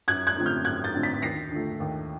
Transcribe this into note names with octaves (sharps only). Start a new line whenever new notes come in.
F#2 F#6 G#6
F#6 G#6
D3 F3 A3 C4
F6 G6
F#2 F#6 G#6
G6 A6
D3 F3 A3 C4
A6 B6
D#2 A#6 C7
D3 F3 A3
D#2